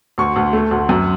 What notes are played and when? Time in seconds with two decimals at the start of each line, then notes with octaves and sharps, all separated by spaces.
0.18 D2 C#6
0.36 D2
0.53 A3
0.71 D2
0.89 F#2